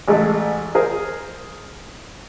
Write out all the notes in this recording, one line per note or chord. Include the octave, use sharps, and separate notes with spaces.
A1 G#3 A3
G#4 A#4 C5